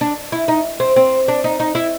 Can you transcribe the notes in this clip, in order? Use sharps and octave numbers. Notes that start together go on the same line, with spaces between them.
D4
E4
D#4
C4
C4
D4
D#4
D#4
E4